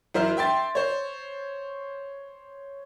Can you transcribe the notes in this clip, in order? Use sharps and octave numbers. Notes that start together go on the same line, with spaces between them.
F#2 E3 A#4 C5 E5 F6
E5 G5 C6 A6
C5 C#5